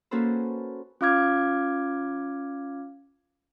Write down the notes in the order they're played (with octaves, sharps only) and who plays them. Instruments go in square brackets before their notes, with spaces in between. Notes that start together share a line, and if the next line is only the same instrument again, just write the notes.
[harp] A#3 C#4 F#4 A4 B4 C5
[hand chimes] C#4 F4 F5 D6 F6 G#6